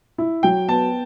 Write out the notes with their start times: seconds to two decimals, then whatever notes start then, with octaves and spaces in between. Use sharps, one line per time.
0.18 E4
0.43 F#3 G5
0.68 B3 A5